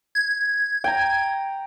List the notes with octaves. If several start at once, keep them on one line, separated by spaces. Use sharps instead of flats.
G#6
G5 A#5